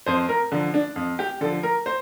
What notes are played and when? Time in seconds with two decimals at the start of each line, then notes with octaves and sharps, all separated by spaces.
0.06 F2 C5
0.29 A#4
0.52 D3 F3
0.74 D4
0.96 F2
1.19 G4
1.41 D3 A4
1.44 F3
1.63 A#4
1.86 C5